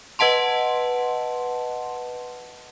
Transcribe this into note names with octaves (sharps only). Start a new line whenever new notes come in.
B4 D#5 F#5 A5 C6